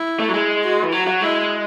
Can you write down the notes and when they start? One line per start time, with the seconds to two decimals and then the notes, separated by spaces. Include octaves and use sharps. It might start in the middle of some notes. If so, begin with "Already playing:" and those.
Already playing: E4
0.20 A3
0.29 F#3
0.34 G#3
0.64 F#4
0.83 E3
0.92 F#3 F#4
1.07 F#3
1.22 G#3 E4